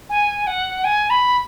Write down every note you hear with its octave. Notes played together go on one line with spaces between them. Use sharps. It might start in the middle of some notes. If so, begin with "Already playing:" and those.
G#5
F#5
G#5
B5